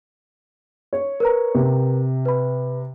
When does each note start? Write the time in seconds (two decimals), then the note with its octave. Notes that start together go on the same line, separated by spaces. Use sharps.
0.93 C#5
1.20 A#4 B4 A#5
1.55 C3
2.25 B4 B5